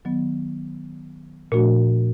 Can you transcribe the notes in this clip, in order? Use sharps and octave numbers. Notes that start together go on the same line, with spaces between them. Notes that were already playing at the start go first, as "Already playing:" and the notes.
D#3 F#3 B3
A#2 F3 A3 D4 F#4